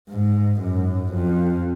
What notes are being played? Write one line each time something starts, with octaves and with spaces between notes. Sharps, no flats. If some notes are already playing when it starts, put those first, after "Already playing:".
G#2
F#2
F2